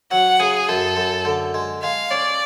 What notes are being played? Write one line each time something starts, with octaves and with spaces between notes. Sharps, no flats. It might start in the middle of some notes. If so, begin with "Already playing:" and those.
F#3 F#5
C#3 G#4
F#2 A4
F#2
D3
G#3
G#3 F5
C#4 D5